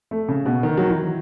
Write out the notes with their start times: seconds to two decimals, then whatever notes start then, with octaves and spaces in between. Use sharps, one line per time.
0.11 A3
0.28 C#3
0.46 B2
0.63 D#3
0.78 F#3
0.89 E3